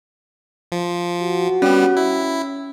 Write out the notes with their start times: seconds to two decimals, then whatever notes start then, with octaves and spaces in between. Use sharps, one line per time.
0.72 F3
1.22 F#4
1.62 G3 B3 C#4
1.97 E4